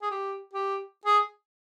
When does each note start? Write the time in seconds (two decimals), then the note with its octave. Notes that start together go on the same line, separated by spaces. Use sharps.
0.02 G#4
0.11 G4
0.53 G4
1.05 G#4